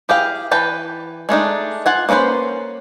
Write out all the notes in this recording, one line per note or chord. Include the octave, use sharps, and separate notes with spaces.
E4 G4 G#4 F5
E3 B4 G5 A5
G#3 A3 D4 D#4
F4 F#5 G#5
A#3 C#4 F4 B4 C5